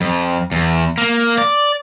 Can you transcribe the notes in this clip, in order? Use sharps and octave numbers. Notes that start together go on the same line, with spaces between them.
F2
E2
A#3
D5